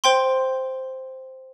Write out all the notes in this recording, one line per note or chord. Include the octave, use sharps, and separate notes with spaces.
C5 G5 C6